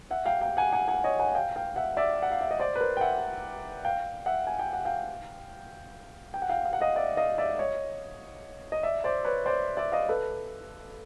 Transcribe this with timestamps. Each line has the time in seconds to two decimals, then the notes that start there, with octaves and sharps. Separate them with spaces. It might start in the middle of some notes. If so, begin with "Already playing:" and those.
0.11 E5 F#5
0.26 F5 G5
0.41 F5 G5
0.57 F#5 G#5
0.73 F#5 G#5
0.88 F#5 G#5
1.04 C#5 D#5
1.19 F#5 G#5
1.35 F5 G5
1.56 F5 G5
1.76 E5 F#5
1.97 D5 E5
2.22 F#5
2.32 F5
2.41 E5
2.51 D#5
2.59 C5 D5
2.75 B4
2.80 A#4 C5
2.97 G5
3.01 E5 F#5
3.85 F5 G5
4.26 E5 F#5
4.47 G#5
4.59 G5
4.73 F#5
4.85 F5 G5
6.34 G5
6.42 F#5
6.49 F5 G5
6.65 F5
6.73 F#5
6.81 D#5 F5
6.96 D5 E5
7.17 D#5 F5
7.38 D5 E5
7.59 C#5 D#5
8.72 D#5
8.83 D5 E5
9.04 C5 D5
9.25 B4 C#5
9.46 C5 D5
9.77 D5 E5
9.92 D#5 F5
10.09 A4 B4